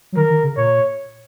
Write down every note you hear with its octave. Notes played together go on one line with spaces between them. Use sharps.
F#3
D#3 A#4
D#3
C#3
A#2 C#5